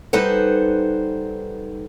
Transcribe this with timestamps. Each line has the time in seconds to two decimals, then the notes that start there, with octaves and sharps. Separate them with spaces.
0.13 G3 D#4 A4 B4 C5 F#5